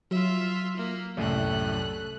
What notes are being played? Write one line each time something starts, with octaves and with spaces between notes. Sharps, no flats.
F#3 F4 E5
A#3
C2 F#2 A2 A3 F#6